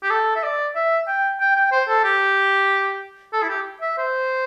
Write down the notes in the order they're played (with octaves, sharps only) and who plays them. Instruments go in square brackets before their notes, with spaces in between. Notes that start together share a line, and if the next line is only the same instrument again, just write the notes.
[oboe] G4
A4
E5
D5
E5
G5
G5
G5
C5
A4
G4
A4
E4
G4
E5
C5